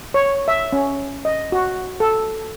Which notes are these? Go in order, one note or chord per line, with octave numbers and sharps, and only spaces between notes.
C#5
E5
C#4
D#5
F#4
A4